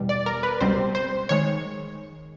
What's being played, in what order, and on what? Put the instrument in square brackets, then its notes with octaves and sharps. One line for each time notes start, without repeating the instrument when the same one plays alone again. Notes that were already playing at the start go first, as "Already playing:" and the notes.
Already playing: [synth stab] E2 B2 G3
D5
A#4
B4
C#2 B2 G3 C4 C5
C5
D#3 G#3 C#5